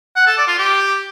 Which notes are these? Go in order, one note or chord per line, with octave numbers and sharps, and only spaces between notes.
F#5
A4
D5
F4
G4